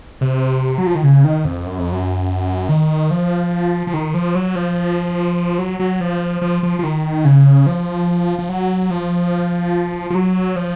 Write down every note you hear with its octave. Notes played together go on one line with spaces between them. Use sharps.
C3
F#3
F3
D#3
C#3
D#3
F2
F#2
F2
F#2
D#3
F3
F3
D#3
F3
F#3
F3
F#3
F#3
F3
F3
F3
F3
D#3
C#3
F3
F3
F#3
F3
F3
F#3
F3